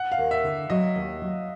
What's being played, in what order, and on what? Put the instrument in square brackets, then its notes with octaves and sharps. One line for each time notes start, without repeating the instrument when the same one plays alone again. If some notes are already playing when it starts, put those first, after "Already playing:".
Already playing: [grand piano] F#5
F5
[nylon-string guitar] D#2
[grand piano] E5
[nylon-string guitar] D3
[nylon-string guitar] F#3 [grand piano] D#5
[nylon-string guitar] D#2
F#3